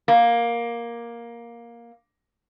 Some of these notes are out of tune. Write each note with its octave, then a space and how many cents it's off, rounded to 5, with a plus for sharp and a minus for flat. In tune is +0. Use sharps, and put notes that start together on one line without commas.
A#3 +10